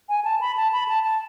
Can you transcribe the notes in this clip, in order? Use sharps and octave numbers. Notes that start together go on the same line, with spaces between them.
G#5
A5
B5
A5
B5
A5
A5